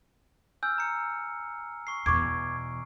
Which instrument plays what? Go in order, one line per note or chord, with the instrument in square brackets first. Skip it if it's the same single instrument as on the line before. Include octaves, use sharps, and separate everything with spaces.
[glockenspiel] G#5 E6 F6 [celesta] G6
[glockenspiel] A#5 C#7
C#6 C7
[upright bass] E2 B2 [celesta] C#6 D6 G#6 [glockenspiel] D7